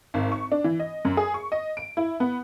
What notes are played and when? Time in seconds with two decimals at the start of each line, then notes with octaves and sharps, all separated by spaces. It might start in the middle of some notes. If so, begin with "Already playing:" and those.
0.14 G#1
0.32 C#6
0.52 D4
0.64 E3
0.80 D#5
1.05 F#2
1.17 G#4
1.34 C#6
1.52 D#5
1.77 D7
1.97 E4
2.20 B3